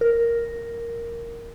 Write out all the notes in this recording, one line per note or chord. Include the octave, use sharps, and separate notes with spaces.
A#4